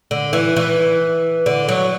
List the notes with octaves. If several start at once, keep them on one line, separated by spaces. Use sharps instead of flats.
D3
E3
E3
D3
F#3